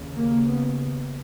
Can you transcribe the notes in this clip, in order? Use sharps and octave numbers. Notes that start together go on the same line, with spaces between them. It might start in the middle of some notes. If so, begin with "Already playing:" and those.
Already playing: D#2 C#3
A#3
B3